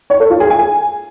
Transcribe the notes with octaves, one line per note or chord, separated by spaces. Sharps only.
C#5
A4
F4
G#4
G#5